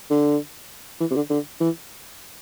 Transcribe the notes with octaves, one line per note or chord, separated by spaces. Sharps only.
D3
E3
C3
D3
D3
E3